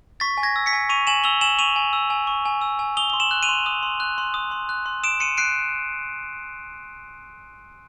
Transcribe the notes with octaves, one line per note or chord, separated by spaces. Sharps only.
C#6 A6 B6
G#5
G#6 A#6
E6
B6 C#7
G#5
C#6 D#7 F7
G#5 E7 F#7
E6 F7 G7
G#5 E7 F#7
C#6 D#7 F7
G#5
E6
G#5
C#6
G#5
E6
G#5
D#6 F7 G7
C6 G7
E7 F#7
F#6
D#7 F7
C6
D#6
C6
F#6
C6
D#6
C6
F#6
C6
D#6 D7 E7
C6 C#7 D#7
F#6 C7 D7